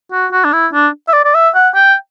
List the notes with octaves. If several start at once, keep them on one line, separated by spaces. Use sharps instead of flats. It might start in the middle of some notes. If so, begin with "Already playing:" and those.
F#4
F#4
D4
E4
D4
E5
D5
D5
E5
F#5
G5